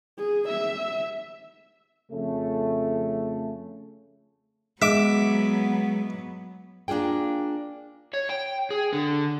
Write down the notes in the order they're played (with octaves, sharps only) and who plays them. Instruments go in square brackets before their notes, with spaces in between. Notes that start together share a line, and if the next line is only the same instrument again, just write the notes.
[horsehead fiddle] G#4
E5
[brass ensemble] F2 C#3 A3
[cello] F#3 B3 [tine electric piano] G#3 [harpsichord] E5 D6
[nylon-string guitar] A#3 D4 F4 G#4 G5
[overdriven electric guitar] C#5
G5
G#4
D3